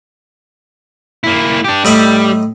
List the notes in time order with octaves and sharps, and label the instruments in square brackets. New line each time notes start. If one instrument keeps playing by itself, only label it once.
[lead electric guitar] A#3 E4
D4 G4
[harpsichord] A2 D#4 E5 [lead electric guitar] G3